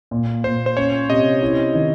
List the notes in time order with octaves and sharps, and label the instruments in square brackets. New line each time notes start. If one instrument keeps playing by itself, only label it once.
[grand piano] A#2
[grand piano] A#2 [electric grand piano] C5
[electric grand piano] C5
[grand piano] C#4 [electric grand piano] C#5
[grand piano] C3 [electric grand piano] D#5
[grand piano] E4
D#3